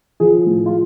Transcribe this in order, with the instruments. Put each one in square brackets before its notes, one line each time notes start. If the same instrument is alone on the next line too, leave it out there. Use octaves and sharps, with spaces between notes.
[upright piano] F3 G#4
A2
F4